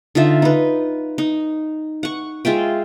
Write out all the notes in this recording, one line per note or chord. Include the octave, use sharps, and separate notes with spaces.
D3 D#4 F4 E5
D#4 B4
D#4
F#5 C#6
G#3 F4 E5 G5